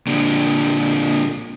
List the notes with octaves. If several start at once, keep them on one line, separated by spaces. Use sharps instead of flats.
A#2 D3